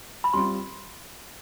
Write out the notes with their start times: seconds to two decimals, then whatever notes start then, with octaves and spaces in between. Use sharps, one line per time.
0.24 B5
0.33 G3 C4 F4 C6